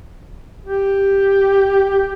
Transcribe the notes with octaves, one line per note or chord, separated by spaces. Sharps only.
G4